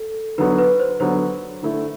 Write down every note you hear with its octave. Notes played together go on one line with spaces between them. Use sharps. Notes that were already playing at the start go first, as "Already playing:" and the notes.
Already playing: A4
D3 F#3 B3 B4
B4
C5
D3 F#3 B3 C5
D3 A3 E4